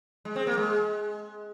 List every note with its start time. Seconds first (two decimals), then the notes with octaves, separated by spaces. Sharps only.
0.25 G#3
0.36 C4
0.47 A#3
0.58 G#3